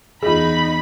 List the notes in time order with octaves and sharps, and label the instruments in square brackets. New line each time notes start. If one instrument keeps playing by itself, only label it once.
[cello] E2 D#4 [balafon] F4 G#4 [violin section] B5